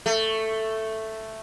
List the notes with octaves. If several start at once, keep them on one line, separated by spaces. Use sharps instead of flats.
A3